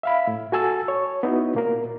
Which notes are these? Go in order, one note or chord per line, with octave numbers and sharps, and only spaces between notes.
E5 F5 B5
A2
F#4 A4 G#5 A5 E6
C#5
B3 D#4 E4 F#4
A#2 A#3 A#4